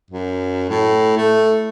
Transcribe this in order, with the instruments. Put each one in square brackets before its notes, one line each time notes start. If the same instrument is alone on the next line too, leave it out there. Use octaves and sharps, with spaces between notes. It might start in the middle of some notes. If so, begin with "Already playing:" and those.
[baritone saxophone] F#2
A2
A3